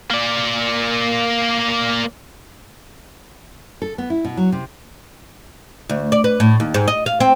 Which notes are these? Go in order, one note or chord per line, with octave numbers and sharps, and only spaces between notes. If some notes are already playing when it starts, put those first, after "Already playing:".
A#3 D5
A4
B3
E4
B2
F#3
C3
D2
D5
B4
A2
D#2
G#2
D#5
F5
C4